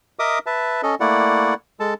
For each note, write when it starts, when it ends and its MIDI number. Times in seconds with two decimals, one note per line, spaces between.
0.19 0.39 70
0.19 0.39 75
0.19 0.39 76
0.19 0.39 86
0.19 0.39 87
0.46 0.81 71
0.46 0.81 76
0.46 0.81 81
0.83 0.95 61
0.83 0.95 69
0.83 0.95 75
1.00 1.54 57
1.00 1.54 58
1.00 1.54 64
1.00 1.54 74
1.00 1.54 78
1.80 1.94 56
1.80 1.94 69
1.80 1.94 81